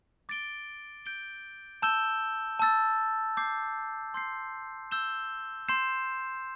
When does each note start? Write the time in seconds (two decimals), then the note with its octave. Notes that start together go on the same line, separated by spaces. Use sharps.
0.29 D6 A6 D7 G7
1.06 G6 D7 G7
1.82 A5 E6 G6 E7 G7
2.60 A5 E6 A6
3.37 D6 G6 C7
4.14 C6 G6 C7
4.91 E6 G6 E7 G7
5.68 C6 G6 C7 E7